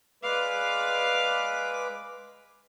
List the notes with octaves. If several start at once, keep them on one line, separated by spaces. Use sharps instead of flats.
G#3 B4 D5 F5 D6